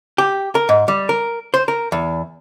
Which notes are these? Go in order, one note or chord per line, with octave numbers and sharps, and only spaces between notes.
G4
A#4
G#2
G3
A#4
C5
A#4
E2